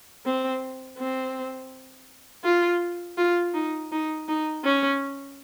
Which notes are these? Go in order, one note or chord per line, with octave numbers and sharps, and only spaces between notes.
C4
C4
F4
F4
D#4
D#4
D#4
C#4